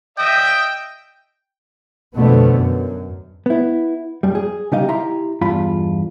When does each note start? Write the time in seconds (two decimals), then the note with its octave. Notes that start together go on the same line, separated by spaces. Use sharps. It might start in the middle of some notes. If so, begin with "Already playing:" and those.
0.18 D#5 E5 G5
2.17 F2 B2 D3 A3 B3
2.54 F#2
3.46 B3 E4
4.23 F#2 G3
4.35 G#4
4.72 C#3 G3 D#4 G4 D#5 F5
4.89 E4 G4 E5 A#5 C6
5.41 E2 G2 F4 B5